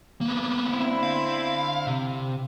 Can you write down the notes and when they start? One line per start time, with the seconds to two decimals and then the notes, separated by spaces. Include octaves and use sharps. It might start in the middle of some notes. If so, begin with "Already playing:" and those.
0.21 A#3 B3
0.67 D3 C4 E4
1.03 F5
1.87 C3